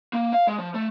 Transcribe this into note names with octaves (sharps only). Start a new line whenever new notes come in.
A#3
F5
G#3
F3
A3